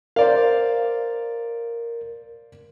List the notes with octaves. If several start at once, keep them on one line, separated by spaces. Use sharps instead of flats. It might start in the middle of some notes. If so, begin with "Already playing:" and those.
A#4 C5 D5 F5